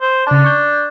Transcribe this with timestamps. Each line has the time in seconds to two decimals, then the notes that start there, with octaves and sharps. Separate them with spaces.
0.01 C5
0.27 C#3 D4 A5
0.44 C#6 G6